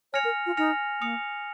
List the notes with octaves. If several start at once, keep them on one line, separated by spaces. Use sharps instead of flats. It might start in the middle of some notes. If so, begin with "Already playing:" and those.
C#5 G#5 F6 A#6 C#7 F7
A#4
F4
D#4 G#5 F6 A#6 C#7 F7
A#3 D#6 C#7 F7